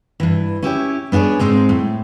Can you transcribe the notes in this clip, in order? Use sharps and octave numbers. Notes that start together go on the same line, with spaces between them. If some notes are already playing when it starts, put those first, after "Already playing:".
G2 E3
C#4 E4 G4 C#5
B3 D4 F#4 G#4 C#5
G#2 G#3 C4 D4 D#4
A2